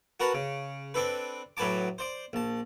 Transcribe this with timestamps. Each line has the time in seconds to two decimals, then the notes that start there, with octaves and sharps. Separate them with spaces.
0.20 F#4 A#4 B4 A5
0.34 C#3
0.94 C4 D4 A4 B4
1.57 A2 F#3 B4 G#5 A5 D6
1.98 C5 D5
2.33 A#1 A5